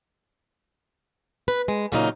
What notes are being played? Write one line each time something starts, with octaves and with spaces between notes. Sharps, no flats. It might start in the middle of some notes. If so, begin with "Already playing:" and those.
B4
G#3
E2 A#2 C#3 F#3 D#4 F5